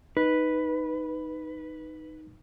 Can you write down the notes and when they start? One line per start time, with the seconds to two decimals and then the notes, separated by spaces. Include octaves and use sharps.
0.17 D#4 B4